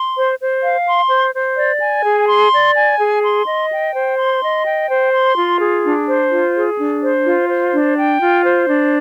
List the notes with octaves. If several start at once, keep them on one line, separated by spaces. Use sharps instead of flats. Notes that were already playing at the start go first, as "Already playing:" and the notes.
Already playing: C6
C5
C5
F5
C6
C5
C5
D5
G#5
G#4
C6
D5
G#5
G#4
C6
D#5
G5
C5
C6
D#5
G5
C5
C6
F4
G#4
D4
C5
F4
G#4
D4
C5
F4
C5
D4
G5
F4
C5
D4